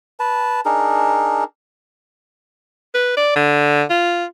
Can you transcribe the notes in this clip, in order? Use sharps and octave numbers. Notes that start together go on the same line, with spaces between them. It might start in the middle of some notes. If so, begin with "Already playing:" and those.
B4 A5
D4 D#4 G#4 A#4
B4
D5
D3
F4